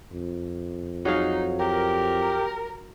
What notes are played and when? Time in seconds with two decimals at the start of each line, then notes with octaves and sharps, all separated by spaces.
0.12 F2
1.05 F#3 D#4 G#4 F5
1.59 G4 A#4